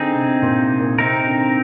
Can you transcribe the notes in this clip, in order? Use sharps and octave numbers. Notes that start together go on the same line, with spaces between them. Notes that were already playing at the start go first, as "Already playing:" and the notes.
Already playing: D3 C4 D#4 G#4
C3
A#2
C3
A#2
C3 C4 D#4 A#4
D3